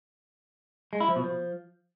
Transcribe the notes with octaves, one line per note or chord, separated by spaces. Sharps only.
G#3
E4
F3
B2
F3